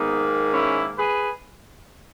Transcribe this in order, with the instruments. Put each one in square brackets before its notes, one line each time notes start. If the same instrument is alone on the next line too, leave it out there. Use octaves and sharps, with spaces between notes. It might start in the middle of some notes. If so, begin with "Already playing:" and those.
Already playing: [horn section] G#2 D#3 A#3 B3 D#4
C#4 E4
G#4 B4